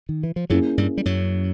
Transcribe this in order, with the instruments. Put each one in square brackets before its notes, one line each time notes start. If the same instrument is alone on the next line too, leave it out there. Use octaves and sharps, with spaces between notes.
[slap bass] D#3
E3
F3
[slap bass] F#2 F#3 [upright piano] A#3 C#4 E4 G#4
[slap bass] G2 G3
G3
F#2 F#3